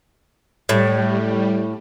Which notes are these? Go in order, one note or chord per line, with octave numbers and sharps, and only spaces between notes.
A2 G3